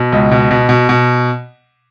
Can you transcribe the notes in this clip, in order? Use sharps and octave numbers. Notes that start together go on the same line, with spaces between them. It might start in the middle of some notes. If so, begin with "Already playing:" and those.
Already playing: B2
C#2
B2
B2
B2
B2